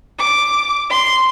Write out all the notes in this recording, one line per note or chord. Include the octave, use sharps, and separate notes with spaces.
D6
C6